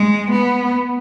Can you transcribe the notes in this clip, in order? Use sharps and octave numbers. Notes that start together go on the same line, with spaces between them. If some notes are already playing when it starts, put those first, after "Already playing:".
Already playing: G#3
B3